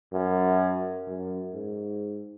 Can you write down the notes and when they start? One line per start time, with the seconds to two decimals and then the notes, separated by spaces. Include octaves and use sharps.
0.13 F#2
1.07 F#2
1.54 G#2